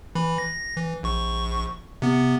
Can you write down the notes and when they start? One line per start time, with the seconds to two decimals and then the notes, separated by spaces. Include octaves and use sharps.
0.15 E3 B5
0.38 A#6
0.77 E3
1.03 A#1 C#6
2.02 C3 B3